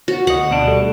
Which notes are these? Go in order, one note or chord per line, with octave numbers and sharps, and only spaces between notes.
F#4
D2 D#5 F#5
B2 D4
G3 A3